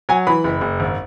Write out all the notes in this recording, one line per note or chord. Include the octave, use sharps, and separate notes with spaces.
F#3 G#5
E3 B5
F#1
F#1
G#1